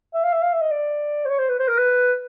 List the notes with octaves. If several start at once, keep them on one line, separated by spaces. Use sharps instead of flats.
E5
F5
E5
F5
E5
D#5
D5
C5
C#5
C5
B4
C5
A#4
B4